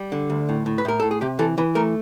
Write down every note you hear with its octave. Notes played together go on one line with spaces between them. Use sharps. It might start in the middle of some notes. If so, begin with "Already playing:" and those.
Already playing: G3
D3
D2
A2
A2
B4
A2 A#4
A2 A4
G#4
C3 G4
E3 A4
E3 B4
A3 A#4